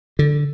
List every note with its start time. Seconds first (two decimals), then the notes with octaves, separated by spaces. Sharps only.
0.19 D3